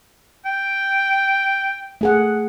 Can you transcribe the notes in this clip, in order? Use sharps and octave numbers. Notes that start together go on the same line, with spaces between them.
G5
A3 G#4 F#5